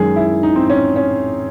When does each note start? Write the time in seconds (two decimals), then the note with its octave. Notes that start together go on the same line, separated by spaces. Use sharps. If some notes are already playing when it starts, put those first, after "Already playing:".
Already playing: F#2 D#3 G#3 G#4
0.16 E4
0.43 D#4
0.56 C4
0.70 C#4
0.96 C#4